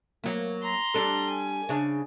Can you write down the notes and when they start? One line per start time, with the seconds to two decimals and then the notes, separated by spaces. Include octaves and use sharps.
0.24 F#3 A#3
0.62 A#5 C6
0.94 G3 D4 A4
1.30 G#5
1.69 C#3 D4